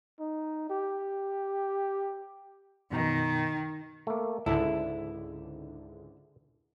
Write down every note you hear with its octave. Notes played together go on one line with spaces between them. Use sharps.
D#4
G4
F#2 B2 D#3 A#5
A3 A#3
C#2 G#2 D3 E4 A4